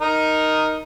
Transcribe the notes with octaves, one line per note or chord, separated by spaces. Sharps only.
D#4 A#4